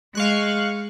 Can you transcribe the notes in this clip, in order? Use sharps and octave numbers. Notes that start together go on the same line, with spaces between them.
G#3 F5 C#6 F#6